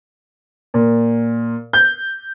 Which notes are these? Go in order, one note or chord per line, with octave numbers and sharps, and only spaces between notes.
A#2
G6